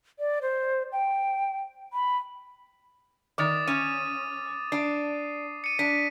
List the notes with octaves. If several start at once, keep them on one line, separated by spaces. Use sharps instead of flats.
D5
C5
G5
B5
D#3 D5 D6 D#6 A6
C#4 D#7
D4 C7
C#7 D#7
D4 B6